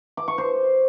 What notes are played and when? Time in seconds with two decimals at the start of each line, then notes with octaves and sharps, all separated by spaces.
0.17 D6
0.28 C#6
0.38 C5